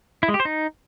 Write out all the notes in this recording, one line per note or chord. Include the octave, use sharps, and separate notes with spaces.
E4
G#3
G4
C5
D#4